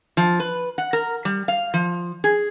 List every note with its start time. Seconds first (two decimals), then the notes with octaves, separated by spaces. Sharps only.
0.17 F3
0.40 B4
0.78 F#5
0.93 A#4
1.25 G3
1.48 F5
1.74 F3
2.24 G#4